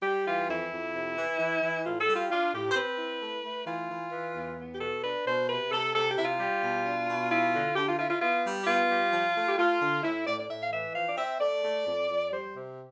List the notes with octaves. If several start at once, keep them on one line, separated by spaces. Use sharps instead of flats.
G3 G4
E3 F4
F2 E4
F2
C3
E3
E3
E3
A2 F4
A4
G3
F4
D4 F4
A2 G4
C5
C4 B4
E4
A3
A3
E3 F4
E3
E3
E2
B3
G4
B2 A4
D4 B4
B2 C5
C3 B4
C3 A4
C3 A4
G4
C3 E4
F4
G3
B2
D4
B2
E4 F4
D3
D3 G4
F4
E4 F4
F4
B3 F4
G3
G4
B3 F4
G3
F3
A3
G4
A3 F4
D3
A2 E4
A2 D5
D5
A2 E5
F5
E3 E5
F3 F5
D5
C4 E5
A3 D5
A3
F2
F2
G3 C5
C3